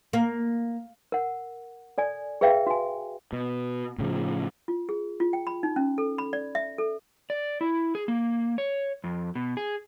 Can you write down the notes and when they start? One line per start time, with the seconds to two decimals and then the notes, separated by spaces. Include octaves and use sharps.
0.13 A#3
1.12 A#4 F#5
1.98 A4 D5 G#5
2.41 G#4 B4 E5 F5 G5
2.67 F#4 G#5
3.33 B2
3.98 A2 C#3 F3
4.68 F4
4.89 G#4
5.20 F4
5.33 G5
5.47 B5
5.63 D#4
5.76 C#4
5.98 A4
6.18 B5
6.33 D5
6.55 E5
6.78 A4
7.30 D5
7.61 E4
7.95 G#4
8.08 A#3
8.58 C#5
9.04 F2
9.35 B2
9.57 G#4